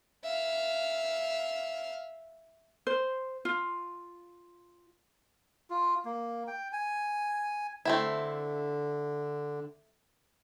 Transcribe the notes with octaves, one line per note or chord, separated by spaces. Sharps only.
E5 F5
C5
F4
F4
A#3
G5
G#5
D3 A3 C4 E4